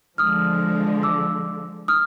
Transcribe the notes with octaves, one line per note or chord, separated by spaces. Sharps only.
D3 F3 G#3 D#6 F6
D6 E6
D#6 F6